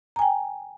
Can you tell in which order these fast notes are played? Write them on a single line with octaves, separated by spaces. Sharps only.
A#5 G#5 G5